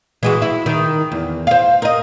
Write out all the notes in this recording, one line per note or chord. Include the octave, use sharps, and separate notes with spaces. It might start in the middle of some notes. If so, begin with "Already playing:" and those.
E3 G#3 F#4
E4
D#3
E2
C5 F5
A#4 D#5